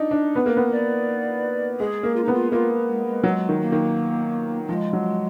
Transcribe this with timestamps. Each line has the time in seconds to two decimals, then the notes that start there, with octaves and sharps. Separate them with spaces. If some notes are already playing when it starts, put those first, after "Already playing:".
Already playing: D4 D#4
0.11 D4
0.35 B3 B4
0.46 A#3
0.57 B3
0.71 D5
1.80 G#3 G#4
2.03 A#3
2.16 F4
2.24 D#4
2.28 B3
2.33 F4
2.52 A#3 F4
2.88 G#3
3.06 G#3
3.23 F#3 G#3
3.49 D#3
3.61 A#3
3.72 D#3
4.69 F3 G#3
4.93 F#3